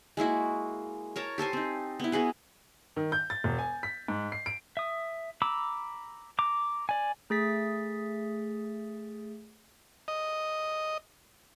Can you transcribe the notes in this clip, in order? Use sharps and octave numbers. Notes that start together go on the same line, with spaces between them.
G#3 A#3 E4 F#4
A#4 C#5 A5 A#5
G4 A4 C5 G#5
C4 D#4
B3 E4
B3 F#4 G#4 B4
D#3
G6
A6
E1
G#5
B6
G#2
C7
D7
E5 D#6
A#5 B5 D6 E6
A#5 D6
D5 G#5
A3 G#4 A6 B6
D#5